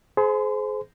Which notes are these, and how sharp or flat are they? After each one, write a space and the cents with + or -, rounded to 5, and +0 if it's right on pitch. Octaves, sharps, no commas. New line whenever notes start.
G#4 +35 C5 -10 C6 -40